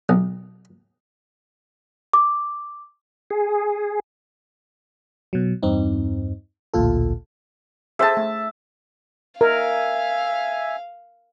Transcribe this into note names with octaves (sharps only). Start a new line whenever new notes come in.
B1
D6
G#4
B2 F#3
E2 G2 C4 D#4
A1 D2 A#2 F4 A4
G#4 A4 C5 E5 A5
A3
A#4 E5 F5 G#5